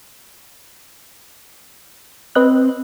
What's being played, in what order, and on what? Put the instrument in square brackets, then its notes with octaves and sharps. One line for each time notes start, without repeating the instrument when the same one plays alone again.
[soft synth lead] C4 [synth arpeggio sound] B4 D#5 F#6